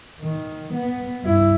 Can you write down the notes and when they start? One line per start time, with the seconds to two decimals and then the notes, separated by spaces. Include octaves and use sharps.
0.21 D#3
0.74 B3
1.22 G2 E4